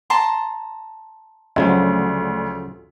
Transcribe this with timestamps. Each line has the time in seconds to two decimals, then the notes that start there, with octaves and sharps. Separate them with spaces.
0.10 A5 A#5 C6
1.56 D2 C#3 F3 F#3